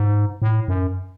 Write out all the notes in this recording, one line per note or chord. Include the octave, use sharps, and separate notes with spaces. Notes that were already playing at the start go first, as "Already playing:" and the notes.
Already playing: G#2
A2
F#2